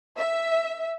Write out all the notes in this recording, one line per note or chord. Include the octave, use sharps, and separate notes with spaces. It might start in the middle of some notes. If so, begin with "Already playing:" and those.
E5